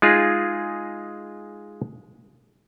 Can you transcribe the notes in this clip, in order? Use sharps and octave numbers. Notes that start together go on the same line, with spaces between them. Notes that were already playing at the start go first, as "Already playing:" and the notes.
G#3 D#4 F4 G#4